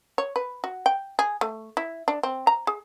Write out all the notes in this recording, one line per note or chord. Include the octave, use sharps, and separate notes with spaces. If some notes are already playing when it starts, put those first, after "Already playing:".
C#5
B4
F#4
G5
G#4
A3
E4
D4
C4
A#5
G#4